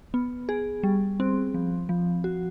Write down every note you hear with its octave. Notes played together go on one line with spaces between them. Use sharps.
B3
G#4
G3
C4
F3
F3
F#4